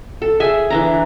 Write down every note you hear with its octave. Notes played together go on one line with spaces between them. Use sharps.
A4
G#4 E5 G#5
E3 D4 A#5